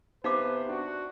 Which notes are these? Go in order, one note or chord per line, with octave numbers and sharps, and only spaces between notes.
C3 B3 D#4 B4 C5 F5 D6
D4 F#4